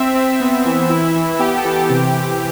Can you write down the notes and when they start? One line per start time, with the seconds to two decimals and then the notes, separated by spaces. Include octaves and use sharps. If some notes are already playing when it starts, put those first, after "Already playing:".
Already playing: C4 E5
0.15 C4
0.40 B3 E5
0.65 E3
0.89 E4
1.15 E3
1.39 B3 G4
1.56 A4
1.64 E3
1.73 G4
1.90 C3
2.14 C3